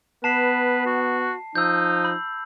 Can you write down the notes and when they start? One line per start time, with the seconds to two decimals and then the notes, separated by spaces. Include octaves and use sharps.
0.24 B3 B4 A5 C7
0.86 F#4
1.56 F3 D#4 E6 G6
2.05 B5